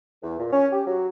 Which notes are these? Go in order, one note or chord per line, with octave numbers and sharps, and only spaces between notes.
E2
A#2
C#4
G4
F#3